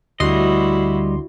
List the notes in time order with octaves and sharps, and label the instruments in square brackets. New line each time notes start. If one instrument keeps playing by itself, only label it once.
[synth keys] D2 C6 [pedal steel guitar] G3 D#5 [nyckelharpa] E4 F#4